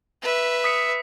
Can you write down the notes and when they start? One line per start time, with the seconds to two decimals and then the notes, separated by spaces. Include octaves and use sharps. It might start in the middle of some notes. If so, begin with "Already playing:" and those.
0.22 B4 E5
0.64 D#6 B6 C#7